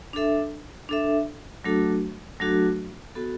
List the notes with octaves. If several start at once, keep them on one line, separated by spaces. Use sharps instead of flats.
D4 A4 E5
D4 A4 E5
F#3 A3 D4 F#4 A4
F#3 A3 D4 F#4 A4
B3 F#4 A4